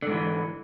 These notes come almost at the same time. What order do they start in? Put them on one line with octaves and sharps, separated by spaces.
D3 G#2 E3